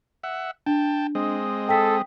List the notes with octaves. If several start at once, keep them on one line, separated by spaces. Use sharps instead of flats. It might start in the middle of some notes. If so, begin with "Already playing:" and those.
E5 F#5
D4 G5 A5
G#3 C4 D#5
A4 G5 D#6 B6